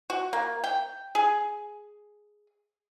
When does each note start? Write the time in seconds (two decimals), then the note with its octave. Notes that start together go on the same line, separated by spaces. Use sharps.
0.10 F#4
0.33 A#3
0.64 G5
1.15 G#4